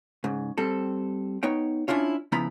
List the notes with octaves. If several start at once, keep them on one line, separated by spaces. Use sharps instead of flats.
G#2 C#3
G3 C4 A4
B3 D#4 C#5 G5
C#4 D4 E4 F4 C#5
C#3 F3 B3 E4 A#5 B5